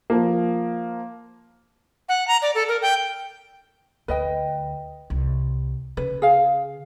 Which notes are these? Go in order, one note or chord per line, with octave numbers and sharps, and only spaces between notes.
F3 A#3
F#5
A#5
D5
A4
A#4
G5
D2 B4 D#5 G5
C2
C#3 B4
G#4 F5